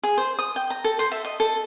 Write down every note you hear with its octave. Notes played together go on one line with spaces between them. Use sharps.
G#4
C5
D#6
G5
A#5
A4
C5
E5
D#5
A4